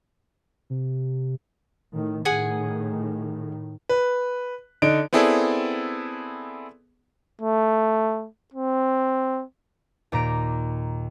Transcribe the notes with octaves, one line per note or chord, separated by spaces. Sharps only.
C3
A2 D#3
A2 D#3 G#4 F#5 G#5
B4
D3 D#4 D7
B3 C4 E4 G#4 A4 D5
A3
C4
D#2 A#2 A#5 A#6 D7